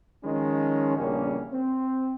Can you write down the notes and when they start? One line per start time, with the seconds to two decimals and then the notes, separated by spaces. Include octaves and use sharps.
0.24 D#3 F3 G#3 C#4
0.97 A#1 E2 C#3 G3 A#3 C#4
1.52 C4